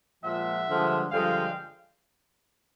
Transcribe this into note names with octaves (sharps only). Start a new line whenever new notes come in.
A#2 F3 G#3 E5 F#5
G2 D3 F3 G#3
G2 D3 F3 G#3 F5 G5